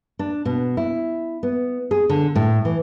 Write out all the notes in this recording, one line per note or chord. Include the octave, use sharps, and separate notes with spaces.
D4
B2
E4
B3
G#4
D3
A2
E3